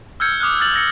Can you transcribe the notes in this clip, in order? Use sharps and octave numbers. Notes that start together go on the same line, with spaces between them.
E6 F6 G6 G#6 C#7
D6 D#6 F6 F#6
D#6 F6 A6 F#7
E6 A#6 C#7